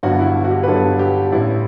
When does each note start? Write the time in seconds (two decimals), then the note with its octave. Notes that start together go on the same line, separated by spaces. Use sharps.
0.03 G1 G2 D3 F#3 B3 F#4
0.19 E4
0.44 F#4
0.51 G4
0.63 B4
0.67 G1 G2 D3 F#3 B3 A4
0.99 G4
1.32 A1 A2 G3 E4